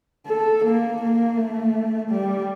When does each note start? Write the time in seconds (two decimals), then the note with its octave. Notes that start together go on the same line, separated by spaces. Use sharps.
0.27 A4
0.65 A#3
1.02 A#3
1.37 A3
2.10 G3